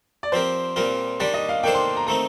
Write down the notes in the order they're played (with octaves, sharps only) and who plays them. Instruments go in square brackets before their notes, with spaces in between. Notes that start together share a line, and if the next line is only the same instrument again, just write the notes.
[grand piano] D5
[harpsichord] F3 C4 G4 A#4 [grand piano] C5
[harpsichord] A#2 G3 C4 F4 A#4
[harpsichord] D#3 G3 D4 G4 [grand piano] D5
[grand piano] D#5
F5
[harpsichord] D#3 A#3 D4 A4 C5 [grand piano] G5
[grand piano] C6
A#5
[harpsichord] D#3 A3 C4 D#4 [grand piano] A#5